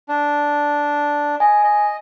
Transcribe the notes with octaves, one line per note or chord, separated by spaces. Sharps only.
D4
D#5 G#5
D#5